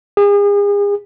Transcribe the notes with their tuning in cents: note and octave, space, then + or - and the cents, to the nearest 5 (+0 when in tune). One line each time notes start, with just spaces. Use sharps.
G#4 -40